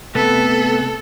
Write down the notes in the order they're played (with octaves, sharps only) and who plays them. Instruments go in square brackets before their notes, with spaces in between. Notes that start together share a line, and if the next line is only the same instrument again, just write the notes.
[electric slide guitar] C3 A3 B3 [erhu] A4